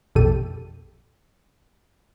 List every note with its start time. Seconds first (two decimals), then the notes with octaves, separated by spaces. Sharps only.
0.15 A#1 F2 B2 G4 A4 D#7